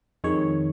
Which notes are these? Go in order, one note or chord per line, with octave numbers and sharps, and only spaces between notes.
F2 D#3 G#3 C#5